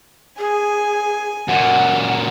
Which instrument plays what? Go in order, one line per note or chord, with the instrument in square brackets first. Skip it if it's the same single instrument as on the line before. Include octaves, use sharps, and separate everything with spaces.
[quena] G#4 [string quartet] G#5
[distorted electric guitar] F#2 A#2 [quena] F#5